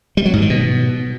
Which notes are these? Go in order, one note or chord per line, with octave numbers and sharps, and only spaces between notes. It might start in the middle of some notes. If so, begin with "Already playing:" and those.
G3
F#3
G#2
D#3
B2